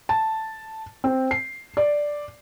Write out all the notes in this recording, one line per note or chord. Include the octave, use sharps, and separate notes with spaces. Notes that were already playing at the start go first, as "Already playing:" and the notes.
A5
C4
C7
D5